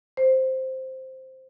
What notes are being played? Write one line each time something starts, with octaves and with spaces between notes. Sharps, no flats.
C5